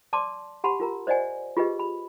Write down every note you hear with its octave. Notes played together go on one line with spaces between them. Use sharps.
D5 A5 C6 D6
G4 F#5 A5 B5 C6
F4 A#4 A#5
C5 D5 D#5 F#5 G#5
F4 G4 G#4 B4 D#5
B5